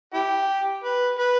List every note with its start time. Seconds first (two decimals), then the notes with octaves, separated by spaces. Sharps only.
0.14 E4 G4
0.84 B4
1.19 B4